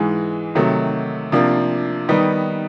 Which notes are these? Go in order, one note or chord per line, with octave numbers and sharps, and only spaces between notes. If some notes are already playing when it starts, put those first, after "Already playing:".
Already playing: G#2 E3 G#3
C3 D#3 F#3 A3
C3 F3 A#3 D4
D#3 G3 B3 D#4